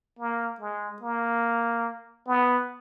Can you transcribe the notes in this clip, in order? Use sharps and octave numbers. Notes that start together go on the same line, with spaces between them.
A#3
G#3
A#3
B3